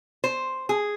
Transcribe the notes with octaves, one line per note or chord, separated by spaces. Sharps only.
C5
G#4